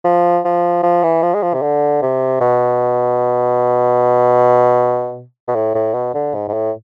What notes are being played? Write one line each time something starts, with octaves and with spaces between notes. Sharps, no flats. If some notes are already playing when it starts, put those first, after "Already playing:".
F3
F3
F3
E3
F3
G#3
F3
C3
D3
C3
B2
B2
A2
A2
B2
D3
G#2
G#2
A2